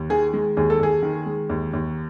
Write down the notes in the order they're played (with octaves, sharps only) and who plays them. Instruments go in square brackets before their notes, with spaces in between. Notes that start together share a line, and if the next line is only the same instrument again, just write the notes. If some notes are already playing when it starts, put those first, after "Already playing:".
Already playing: [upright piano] D#2
D#3 G#4
G#3
D#2 G#4
A4
D#2 G#4
D#3
G#3
D#2
D#2